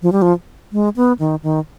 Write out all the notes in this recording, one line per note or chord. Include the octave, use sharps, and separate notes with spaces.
F3
G3
F3
G#3
B3
D#3
D#3